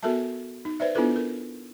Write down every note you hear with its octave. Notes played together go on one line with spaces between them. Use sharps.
B3 F#4 A4 A#4 E5 A5
D#4
B4 C5 D5 E5
B3 D4 E4 F4 A4 B4
A#4